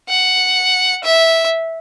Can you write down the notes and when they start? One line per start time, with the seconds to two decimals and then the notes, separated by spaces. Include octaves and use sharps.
0.09 F#5
1.04 E5